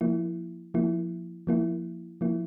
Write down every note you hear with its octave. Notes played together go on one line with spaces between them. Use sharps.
F3 A#3 E4
F3 A#3 E4
F3 A#3 E4
F3 A#3 E4